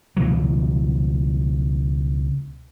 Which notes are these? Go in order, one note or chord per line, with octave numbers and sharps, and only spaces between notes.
C#2 B2 E3 F#3